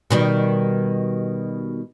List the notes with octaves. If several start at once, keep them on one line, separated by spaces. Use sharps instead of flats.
B2 D#3 G3